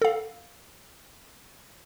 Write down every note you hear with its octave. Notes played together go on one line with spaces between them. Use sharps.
A4 F5